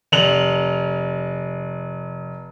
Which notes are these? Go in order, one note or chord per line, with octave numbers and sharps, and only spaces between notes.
F1 F7 F#7